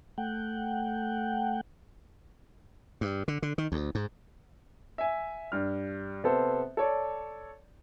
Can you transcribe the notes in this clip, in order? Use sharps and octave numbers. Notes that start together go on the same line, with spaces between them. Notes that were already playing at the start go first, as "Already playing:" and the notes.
A3 F#5 G5
G2
D3
D3
D#3
D2
G#2
E5 G#5
G2 F6
C3 B3 C4 A4 C5
A4 C#5 D5